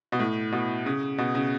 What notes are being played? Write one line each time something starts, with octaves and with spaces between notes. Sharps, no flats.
B2
A2
B2
C#3
B2
C#3